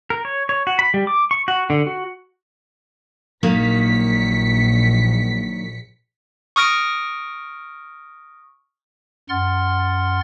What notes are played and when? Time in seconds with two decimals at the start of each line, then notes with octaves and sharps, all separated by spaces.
0.10 A#4
0.25 C#5
0.49 C#5
0.67 F#4
0.79 B5
0.94 G3
1.07 D6
1.31 C#6
1.48 F#4
1.70 D3
1.87 F#4
3.43 A#1 D#3 F#3 A#3 B6 C#7
6.56 C#6 D#6 F6 A#6 D7
9.29 F#2 F#5 C6 F6 A6